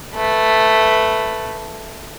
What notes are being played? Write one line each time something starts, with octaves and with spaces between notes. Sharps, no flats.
A3 B4